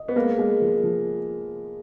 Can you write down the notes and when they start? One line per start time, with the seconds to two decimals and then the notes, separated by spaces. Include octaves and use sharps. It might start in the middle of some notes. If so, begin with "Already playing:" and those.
Already playing: D#5
0.08 B3
0.16 G#3 A#3
0.38 G#3
0.61 F3
0.84 F3